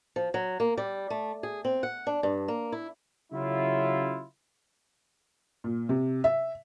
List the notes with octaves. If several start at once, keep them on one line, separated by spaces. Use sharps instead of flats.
F3
F#3
A#3
G3
A3
G#4
C4
F#5
D4
G2
A#3
E4
C#3 F#3 E4 F4
A#2
C3
E5